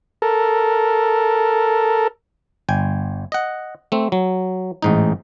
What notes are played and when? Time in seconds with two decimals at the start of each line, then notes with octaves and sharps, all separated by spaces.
0.22 A4 A#4
2.69 G1 G5 G#5
3.32 D#5 F#5
3.92 A3 C4
4.12 F#3
4.82 A1 G#2 D#4